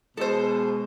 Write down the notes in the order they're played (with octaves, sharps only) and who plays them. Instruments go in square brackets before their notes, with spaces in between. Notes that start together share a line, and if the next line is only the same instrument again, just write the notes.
[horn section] B2 G#3 [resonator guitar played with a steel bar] A4 C5